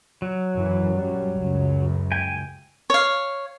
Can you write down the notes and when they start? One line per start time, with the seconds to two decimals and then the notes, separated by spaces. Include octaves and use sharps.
0.22 F#3
0.56 F#2 E3
0.95 F#2 G3
1.35 C#2 F#2 C#3
2.12 G5 G#5
2.90 C#5 F5